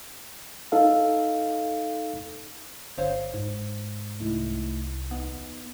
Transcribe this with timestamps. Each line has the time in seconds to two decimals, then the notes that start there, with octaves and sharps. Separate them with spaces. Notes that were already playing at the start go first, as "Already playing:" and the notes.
0.72 D#4 A4 F5
2.98 G1 C5 C#5 F5
3.34 G#2
4.20 C2 A3 D#4 E4
5.11 D#2 B3 D#4